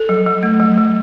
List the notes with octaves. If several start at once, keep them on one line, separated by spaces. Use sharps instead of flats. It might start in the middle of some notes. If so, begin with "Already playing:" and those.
Already playing: A4
F#3
F#3
A3
F#3
F#3